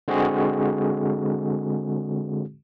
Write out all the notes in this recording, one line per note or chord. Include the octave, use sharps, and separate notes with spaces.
D3 G#3 C4 F#4 G#4